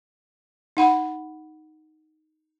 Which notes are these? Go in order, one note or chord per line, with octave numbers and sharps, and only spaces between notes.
D#4 F#5 B5